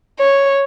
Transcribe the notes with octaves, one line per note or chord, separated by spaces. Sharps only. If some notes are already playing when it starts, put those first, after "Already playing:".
C#5